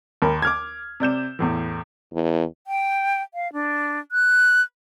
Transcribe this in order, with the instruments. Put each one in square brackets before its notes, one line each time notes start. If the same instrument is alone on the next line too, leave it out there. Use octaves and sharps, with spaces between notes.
[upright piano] D#2 A#4 B5
D6 F6 G#6
C3 D5 G6 E7
E2 A2 E3
[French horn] E2
[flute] G5
F5
D4
F#6